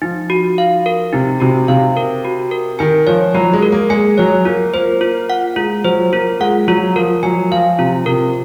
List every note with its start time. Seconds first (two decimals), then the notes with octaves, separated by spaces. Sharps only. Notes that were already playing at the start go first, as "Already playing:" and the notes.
0.02 F3 D#4
0.30 F#4
0.58 F5
0.86 A#4
1.13 C3 D#4
1.40 C3 F#4
1.68 C3 F5
1.97 A#4
2.25 F#4
2.51 A#4
2.79 D#3 G#5
3.07 F3 C#5
3.34 F#3 F#4
3.53 G#3
3.62 A#4
3.72 A#3
3.90 G#3 G#5
4.18 F#3 C#5
4.45 A#3 F4
4.74 A#3 C5
5.01 F4
5.30 F#5
5.56 G#3 F4
5.84 F#3 C5
6.13 A#3 F4
6.40 G#3 F#5
6.68 F#3 F4
6.96 F3 A#4
7.23 F#3 G#5
7.52 F3 F5
7.79 C3 F4
8.06 C3 A#4